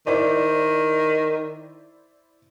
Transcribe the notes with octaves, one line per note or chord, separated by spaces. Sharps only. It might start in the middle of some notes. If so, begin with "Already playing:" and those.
D#3 E4 C5 D5